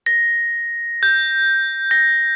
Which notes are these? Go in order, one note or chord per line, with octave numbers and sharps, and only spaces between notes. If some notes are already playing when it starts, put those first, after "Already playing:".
A#6
G6
A#6